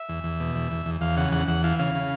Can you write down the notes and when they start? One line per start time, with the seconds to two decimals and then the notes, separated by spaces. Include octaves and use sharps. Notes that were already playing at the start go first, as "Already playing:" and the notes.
Already playing: E5
0.09 E2
0.24 E2
0.40 B2
0.56 E2
0.71 E2
0.86 E2
1.01 E2 F5
1.17 C#3 F#5
1.32 E2 F#5
1.48 E2 F#5
1.64 E3 F5
1.79 C#3 F5
1.95 C#3